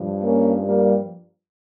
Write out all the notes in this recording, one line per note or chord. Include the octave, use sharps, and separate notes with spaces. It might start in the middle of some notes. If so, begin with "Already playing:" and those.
Already playing: G2 F3
A#3 C#4
G3 A#3